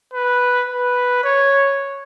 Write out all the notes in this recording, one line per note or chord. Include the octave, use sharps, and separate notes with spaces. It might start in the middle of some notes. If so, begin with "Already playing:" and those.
B4
B4
C#5